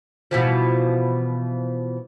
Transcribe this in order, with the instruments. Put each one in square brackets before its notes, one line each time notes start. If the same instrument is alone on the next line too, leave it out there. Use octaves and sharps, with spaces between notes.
[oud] B2 E3 F3